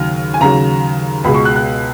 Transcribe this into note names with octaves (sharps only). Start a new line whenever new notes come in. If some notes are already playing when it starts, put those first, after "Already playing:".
Already playing: D#2 C#3 F#3 F6
G#5
D#2 C#3 F#3 A#5
C#2 B2 G#3 B5
C#6
F#6
F#6